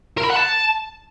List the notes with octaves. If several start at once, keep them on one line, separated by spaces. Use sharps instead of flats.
A#4
B5
F#5
A5